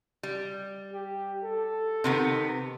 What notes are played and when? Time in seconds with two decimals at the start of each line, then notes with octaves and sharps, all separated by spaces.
0.23 G3
0.93 G4
1.43 A4
2.04 C3 D#3 B3